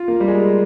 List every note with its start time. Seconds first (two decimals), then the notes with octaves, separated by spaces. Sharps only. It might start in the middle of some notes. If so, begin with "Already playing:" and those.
Already playing: F4
0.08 A#3
0.20 G3
0.28 G#3